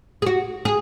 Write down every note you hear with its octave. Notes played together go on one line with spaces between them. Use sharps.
G#4
F#4
G#4